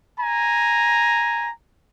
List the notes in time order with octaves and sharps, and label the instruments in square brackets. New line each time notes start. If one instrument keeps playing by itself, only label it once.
[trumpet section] G#5 A#5